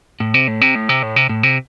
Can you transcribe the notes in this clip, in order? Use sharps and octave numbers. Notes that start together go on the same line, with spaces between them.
A2
C3
A2
C3
A2
C3
A2
C3
A2
C3